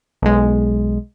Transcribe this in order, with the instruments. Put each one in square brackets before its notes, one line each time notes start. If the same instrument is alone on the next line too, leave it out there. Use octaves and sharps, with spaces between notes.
[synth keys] B1 G#3